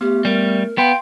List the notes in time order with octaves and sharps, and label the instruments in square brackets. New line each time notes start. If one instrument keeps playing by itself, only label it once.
[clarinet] A3 [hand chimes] B3 [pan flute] G4
[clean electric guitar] G3 [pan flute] A#4
[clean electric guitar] B3 [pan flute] F5 [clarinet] G5 [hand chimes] C6